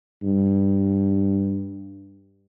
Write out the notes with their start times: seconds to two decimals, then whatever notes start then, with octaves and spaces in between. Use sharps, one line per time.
0.23 G2